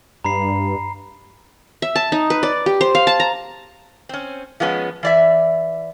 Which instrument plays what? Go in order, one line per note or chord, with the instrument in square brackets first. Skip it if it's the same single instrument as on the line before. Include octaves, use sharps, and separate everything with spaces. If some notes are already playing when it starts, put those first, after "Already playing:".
[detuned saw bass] G2 [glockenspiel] A#5 B5 C7
[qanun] E5
A5
D#4
B4
D5
G4
C5
F5
A5
A#5
[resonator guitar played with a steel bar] C4 C#4
F3 G#3 B3 C#4
E3 D5 E5